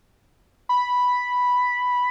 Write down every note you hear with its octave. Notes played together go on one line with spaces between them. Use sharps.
B5